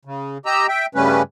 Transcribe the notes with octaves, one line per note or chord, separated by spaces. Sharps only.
C#3
G4 D#5 A#5 E6
E5 G5
G2 C#3 G3 A3 C#4 B4